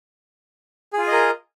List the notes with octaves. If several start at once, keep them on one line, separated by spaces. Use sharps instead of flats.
F4 G#4 A#4 D#5 G#5